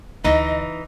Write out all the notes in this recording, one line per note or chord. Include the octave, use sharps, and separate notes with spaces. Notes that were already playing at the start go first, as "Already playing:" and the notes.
D2 E3 D#4 D#5